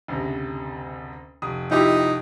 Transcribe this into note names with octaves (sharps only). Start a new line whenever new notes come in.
F#1 D2 C3
F1 D#6
F2 D#4 E4 G4